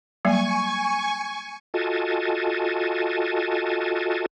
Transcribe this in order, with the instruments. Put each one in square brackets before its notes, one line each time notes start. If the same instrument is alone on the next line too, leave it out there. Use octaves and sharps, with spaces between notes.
[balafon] F#3 G3 A#3 [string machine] G#5 C#6
[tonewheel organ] F4 F#4 A4 D#5 G#5 A5